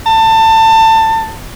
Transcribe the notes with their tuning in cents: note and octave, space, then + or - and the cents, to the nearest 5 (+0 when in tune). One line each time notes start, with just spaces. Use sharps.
A5 +25